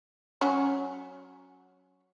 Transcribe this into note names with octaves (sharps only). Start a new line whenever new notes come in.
F#3 C#4 C#5